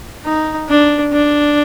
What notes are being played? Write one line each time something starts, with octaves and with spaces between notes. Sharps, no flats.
D#4
D4
D4